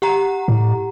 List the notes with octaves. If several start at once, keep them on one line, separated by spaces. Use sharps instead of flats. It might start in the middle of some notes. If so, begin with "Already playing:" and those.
G4 F#5 A#5
A2